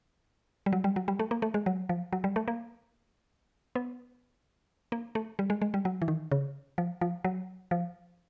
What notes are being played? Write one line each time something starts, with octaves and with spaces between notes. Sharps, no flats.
G3
F#3
G3
F#3
G3
A3
A#3
A3
G#3
F#3
F3
F#3
G3
A3
A#3
B3
A#3
A3
G3
G#3
G#3
G3
F#3
E3
D#3
C#3
F3
F3
F#3
F3